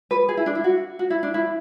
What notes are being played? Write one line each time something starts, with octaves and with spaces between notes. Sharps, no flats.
B4
G#4
E4
D4
E4
F#4
F#4
E4
D4
E4